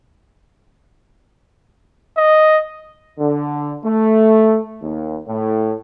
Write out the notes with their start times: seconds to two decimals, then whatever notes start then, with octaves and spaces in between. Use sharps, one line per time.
2.18 D#5
3.19 D3
3.85 A3
4.82 D#2
5.27 A2